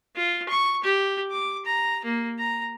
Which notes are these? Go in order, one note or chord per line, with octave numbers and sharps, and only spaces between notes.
F4
C#6
G4
D6
A#5
A#3
A#5